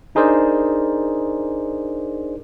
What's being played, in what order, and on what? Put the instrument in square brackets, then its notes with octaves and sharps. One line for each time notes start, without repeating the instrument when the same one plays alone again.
[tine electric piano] D4 D#4 G#4 A#4 C5 D5